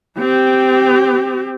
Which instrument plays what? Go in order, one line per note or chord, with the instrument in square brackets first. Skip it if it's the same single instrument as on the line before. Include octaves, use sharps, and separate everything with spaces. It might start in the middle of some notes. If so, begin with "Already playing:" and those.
[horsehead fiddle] C4 G4